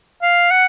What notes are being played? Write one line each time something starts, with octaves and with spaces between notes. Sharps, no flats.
F5
F#5